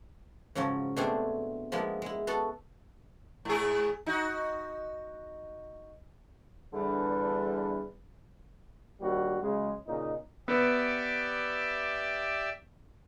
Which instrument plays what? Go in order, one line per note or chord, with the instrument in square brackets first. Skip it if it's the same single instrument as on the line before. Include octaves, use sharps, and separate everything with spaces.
[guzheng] G#2 C#3 F3 F#3 C#4
B2 A3 C4 D4 G4 G#4
F3 G#3 A#3 B3 E4
G#3 E4
B3 F#4 A4 A5
[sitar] G#2 G#4
D#4 F#4
[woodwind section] E2 D3 G3 D4
[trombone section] A#1 D#2 G3 F#4
C#3 F#3 G#3
A#2 C#3 D#4
[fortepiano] B3 [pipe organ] G4 D5 E5